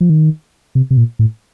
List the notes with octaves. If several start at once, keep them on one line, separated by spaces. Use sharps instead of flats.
F3
D#3
C3
C3
A#2
A2